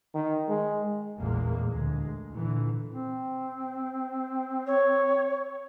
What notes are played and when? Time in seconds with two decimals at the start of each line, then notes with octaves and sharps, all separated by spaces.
0.14 D#3
0.48 G#3
1.18 A1 E2 A#2 G#3 A#3
1.70 D2 G#3
2.32 A#2 D3 E3
2.92 C4
4.67 C#5